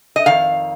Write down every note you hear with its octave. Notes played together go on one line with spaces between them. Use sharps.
D#5
F2 D#3 F5